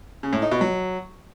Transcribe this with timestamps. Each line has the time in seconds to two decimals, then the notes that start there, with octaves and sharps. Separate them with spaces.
0.23 C#3
0.33 A2
0.42 D#4
0.52 B2
0.61 F#3